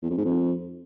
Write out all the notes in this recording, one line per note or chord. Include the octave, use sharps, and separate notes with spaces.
E2
F2
G#2
F2